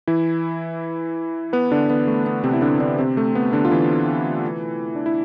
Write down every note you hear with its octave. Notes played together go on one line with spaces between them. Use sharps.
E3 E4
B3 B4
D3 D4
B3
A3
B3
C3 C4
E4
D3 D4
D3 D4
C3 C4
A3
B3
D3 D4
F4
E3 E4
D4
E4